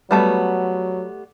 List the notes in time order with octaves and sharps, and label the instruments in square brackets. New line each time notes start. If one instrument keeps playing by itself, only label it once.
[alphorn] F#3 [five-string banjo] G3 A3 B3